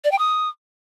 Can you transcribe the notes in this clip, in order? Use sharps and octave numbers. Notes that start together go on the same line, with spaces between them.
D5
G5
D#6